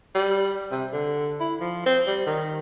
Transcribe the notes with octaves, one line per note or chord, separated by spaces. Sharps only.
G3
C3
D3
E4
F3
C4
G3
D#3